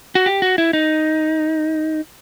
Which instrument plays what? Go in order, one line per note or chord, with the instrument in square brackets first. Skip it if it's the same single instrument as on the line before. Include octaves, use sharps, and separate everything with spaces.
[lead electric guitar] F#4
G4
F#4
E4
D#4